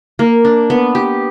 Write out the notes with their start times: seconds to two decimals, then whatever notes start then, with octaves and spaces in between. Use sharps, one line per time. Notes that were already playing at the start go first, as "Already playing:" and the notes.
0.19 A#3
0.45 D4
0.70 B3
0.95 G4